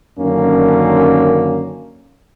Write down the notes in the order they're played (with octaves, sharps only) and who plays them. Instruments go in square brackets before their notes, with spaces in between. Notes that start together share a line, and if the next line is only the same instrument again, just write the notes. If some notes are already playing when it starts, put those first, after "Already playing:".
[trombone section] F#2 D3 D#3 A#3 C#4